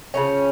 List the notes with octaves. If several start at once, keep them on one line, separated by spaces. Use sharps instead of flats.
C#3 F3 G#3 C#4